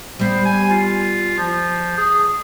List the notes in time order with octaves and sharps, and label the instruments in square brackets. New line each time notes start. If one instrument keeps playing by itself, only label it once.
[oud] G3 B3 [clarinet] C5
[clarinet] G#5
F4
F3
G#4